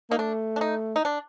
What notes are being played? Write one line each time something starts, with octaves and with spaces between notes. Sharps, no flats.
A#3 D#4
A3 D4
D4
D#4
D#4
D4